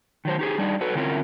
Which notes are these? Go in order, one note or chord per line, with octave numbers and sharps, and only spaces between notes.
D#3 F#3 C5
D#4 G4 G#4
G3 D4 D#4
F#4 A4 B4
D3 C4 C#4 E4 F4 A#4